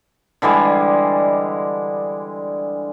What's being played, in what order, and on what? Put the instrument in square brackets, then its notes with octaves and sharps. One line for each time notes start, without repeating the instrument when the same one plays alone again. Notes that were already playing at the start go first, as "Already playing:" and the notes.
[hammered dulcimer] D3 E3 G3 G#3